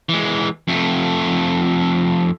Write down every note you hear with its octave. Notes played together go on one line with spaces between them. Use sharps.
E3 G#3
F2 A3